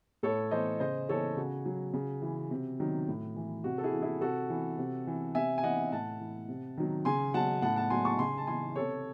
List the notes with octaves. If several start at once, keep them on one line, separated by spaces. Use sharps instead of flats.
A2 A4 C#5
E3 C5 D#5
C#3 C5 D#5
E3 A4 C#5
C#3 F#4
F#3
C#3
E3
C3
D#3 F#3
A2
E3
C3 F#4
A4
E4 G#4
E3
E4 G#4
C3 F#4 A4
E3
C3
E3
C3 E5 G#5
G#5
E3 D#5 F#5
A2 F#5 A5
E3
C3
D#3 F#3
C#3 G#5 C6
F#3 F#5 A5
A2 F#5 A5
F#5 A5
F#3 G#5 C6
A5 C#6
C#3 G#5 C6
A5
E3 G#5 C6
C3 A4 C#5